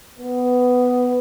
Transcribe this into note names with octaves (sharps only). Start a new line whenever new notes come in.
B3